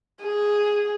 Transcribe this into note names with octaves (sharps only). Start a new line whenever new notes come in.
G#4